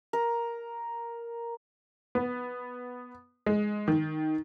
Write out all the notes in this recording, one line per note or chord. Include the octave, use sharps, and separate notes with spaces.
A#4
B3
G#3
D#3